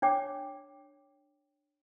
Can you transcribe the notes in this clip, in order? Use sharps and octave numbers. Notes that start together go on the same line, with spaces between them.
D4 C#5 G5 D6